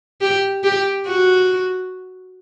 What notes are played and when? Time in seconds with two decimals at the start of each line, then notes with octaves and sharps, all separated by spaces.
0.21 G4
0.64 G4
1.06 F#4